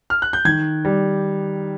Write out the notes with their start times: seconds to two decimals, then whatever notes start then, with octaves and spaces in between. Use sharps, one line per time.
0.10 F6
0.22 F#6
0.33 G6
0.45 D#3 G#6
0.85 G3